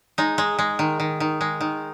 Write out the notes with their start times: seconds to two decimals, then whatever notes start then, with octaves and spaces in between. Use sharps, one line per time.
0.18 G#3 D#4
0.38 G#3
0.59 G#3
0.79 D#3
1.00 D#3
1.20 D#3
1.41 G#3
1.61 D#3